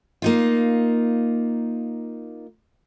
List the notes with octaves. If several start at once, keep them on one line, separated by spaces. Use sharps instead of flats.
A#3 D#4 F4